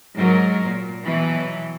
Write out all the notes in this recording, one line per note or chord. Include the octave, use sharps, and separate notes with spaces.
G#2 F#3 A#4
A#2
B2 E3 F#3